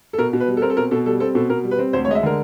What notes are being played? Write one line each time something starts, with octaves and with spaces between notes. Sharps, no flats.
A4
B2 A#4
B2
B4
G3
A4
C4 A#4
A4
B2 A#4
B2 A4
G3 A4
C4 A4
B2 A4
B2 A#4
G3
B4
C4
D2 C5
C#5
G#3 D#5
E5
D3 A#4